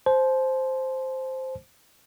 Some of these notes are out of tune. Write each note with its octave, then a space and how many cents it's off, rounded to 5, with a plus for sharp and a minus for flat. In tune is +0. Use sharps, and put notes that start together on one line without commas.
C5 +0 A5 -40